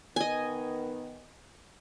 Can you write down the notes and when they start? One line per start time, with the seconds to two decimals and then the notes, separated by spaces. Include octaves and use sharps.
0.16 D#3 B3 D#5 G#5